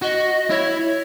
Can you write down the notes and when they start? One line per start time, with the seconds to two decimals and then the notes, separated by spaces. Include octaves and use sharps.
0.02 F#4 D#5
0.50 E4 C#5